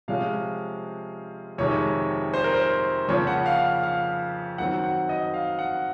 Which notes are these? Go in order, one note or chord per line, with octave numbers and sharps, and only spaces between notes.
C3 F3 G#3 C#4 F5
F2 C3 D#3 G#3 C#5
C5
A#4
C5
F2 C#3 F3 A#3 C#5
F#5
F5
F5
F#2 D#3 F#3 C4 F#5
F#5
D#5
F5
F#5